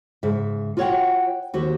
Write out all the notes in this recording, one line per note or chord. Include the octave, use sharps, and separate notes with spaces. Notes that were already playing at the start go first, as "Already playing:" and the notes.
G#2 C#3 E5
F4 F#4 C#5 D#5 F#5 G5
D#2 F#4 G4 C5